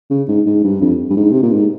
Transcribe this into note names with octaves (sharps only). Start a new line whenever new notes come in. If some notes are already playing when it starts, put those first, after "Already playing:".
C#3
G#2
G#2
G2
F2
G2
G#2
C3
A#2
G#2